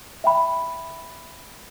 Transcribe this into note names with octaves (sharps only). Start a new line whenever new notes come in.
E5 G5 B5